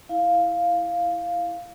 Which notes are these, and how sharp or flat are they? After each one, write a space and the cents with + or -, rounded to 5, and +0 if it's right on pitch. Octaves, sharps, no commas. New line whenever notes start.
E4 +0 F5 +0